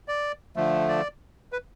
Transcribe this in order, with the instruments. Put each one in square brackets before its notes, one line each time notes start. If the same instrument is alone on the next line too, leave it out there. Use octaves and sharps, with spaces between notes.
[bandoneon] D5
D3 F3 A3
D5
B4